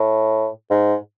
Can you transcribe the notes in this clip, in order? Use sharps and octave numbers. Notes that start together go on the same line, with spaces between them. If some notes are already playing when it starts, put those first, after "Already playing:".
Already playing: A2
G#2